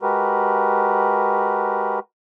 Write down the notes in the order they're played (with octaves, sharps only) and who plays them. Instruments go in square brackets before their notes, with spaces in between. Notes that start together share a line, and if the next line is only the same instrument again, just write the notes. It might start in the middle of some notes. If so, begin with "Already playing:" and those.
[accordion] G#3 F#4 G4 A#4 B4